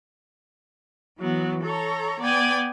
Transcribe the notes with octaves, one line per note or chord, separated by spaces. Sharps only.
E3 F#3 B3
A4 C#5 A#5
B3 D5 G5 G#5